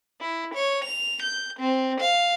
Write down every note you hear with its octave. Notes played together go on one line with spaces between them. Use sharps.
E4
C#5
F7
G6
C4
F5